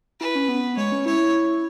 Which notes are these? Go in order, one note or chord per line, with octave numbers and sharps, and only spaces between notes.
E4 B4
C#4
B3
G#3 C#5
C#4
E4 C#5